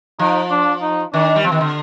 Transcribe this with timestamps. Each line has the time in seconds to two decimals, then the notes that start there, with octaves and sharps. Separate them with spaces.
0.19 F3 D#4
0.51 D4
0.82 D#4
1.14 D#3 D4
1.36 G3
1.44 F3 C4
1.52 D#3
1.61 D3